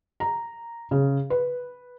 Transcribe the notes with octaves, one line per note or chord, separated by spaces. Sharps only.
A#5
C#3
B4